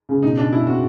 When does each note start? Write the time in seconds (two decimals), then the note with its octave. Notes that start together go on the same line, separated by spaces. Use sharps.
0.09 C#3
0.23 B2 D#4
0.37 B2 D4
0.52 B2 E4
0.67 C4 F#4